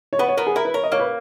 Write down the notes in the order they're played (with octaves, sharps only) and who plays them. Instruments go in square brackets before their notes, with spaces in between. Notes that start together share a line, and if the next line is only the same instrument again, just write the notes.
[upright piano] C#5
[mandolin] B3 [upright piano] B4
[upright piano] C#5
[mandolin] B3 [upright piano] A#4
[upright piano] G#4
[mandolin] E4 [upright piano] A#4
[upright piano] B4
[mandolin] A#4 [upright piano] C#5
[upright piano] D#5
[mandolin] A#3 [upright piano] C#5
[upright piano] B4